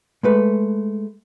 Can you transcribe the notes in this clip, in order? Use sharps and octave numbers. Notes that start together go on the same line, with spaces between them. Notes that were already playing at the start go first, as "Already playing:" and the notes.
G#3 A3 B4